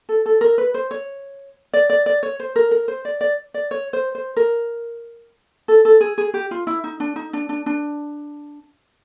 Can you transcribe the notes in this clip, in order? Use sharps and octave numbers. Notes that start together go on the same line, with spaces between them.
A4
A4
A#4
B4
C5
C#5
D5
D5
D5
C#5
C5
A#4
A#4
C5
D5
D5
D5
C#5
C5
C5
A#4
A4
A4
G#4
G#4
G4
F4
E4
D#4
D4
D#4
D4
D4
D4